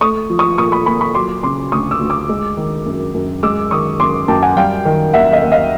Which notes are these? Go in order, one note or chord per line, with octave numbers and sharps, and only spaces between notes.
A3 C#6 D#6
F3
C#6 D#6
A#2 C#6 D#6
B5 C#6
A#2 B5 C#6
B5 C#6
F#3 C6 D6
C#3 C6 D6
D2 C#6 D#6
D6 E6
D2
D6 E6
G#3
D#3
F#2
F#2
G#3 D6 E6
D#3 C#6 D#6
F#2 C6 D6
F#2 G5 A5
F#5 G#5
G3 F5 G5
D#3
D#2 E5 F#5
D#5 F5
D#2
D#5 F5